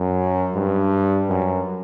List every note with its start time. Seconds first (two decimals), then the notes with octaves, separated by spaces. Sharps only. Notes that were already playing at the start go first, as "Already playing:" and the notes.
Already playing: F#2
0.55 G2
1.29 F#2